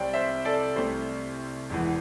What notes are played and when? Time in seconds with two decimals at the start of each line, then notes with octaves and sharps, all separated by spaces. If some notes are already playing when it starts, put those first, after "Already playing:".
Already playing: C2 C3 G3 C4 D5 G5
0.13 C5 E5
0.45 A4 D5
0.76 C2 C3 A3 C5
1.70 E1 E2 E3